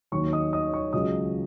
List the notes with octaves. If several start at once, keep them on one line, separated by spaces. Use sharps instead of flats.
D#2 D#3 F#3 C#5 C#6
D#5 D#6
D#5 D#6
C#5 C#6
C#2 C#3 F#3 D#5 D#6